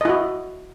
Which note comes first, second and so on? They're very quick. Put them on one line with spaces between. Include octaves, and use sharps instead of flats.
D#5 E4 F#4